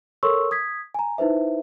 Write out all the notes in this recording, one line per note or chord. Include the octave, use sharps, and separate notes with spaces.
A4 A#4 C#5 C6 C#6 E6
D#6 G#6 B6
G#5 A#5
D#4 E4 B4 C5 E5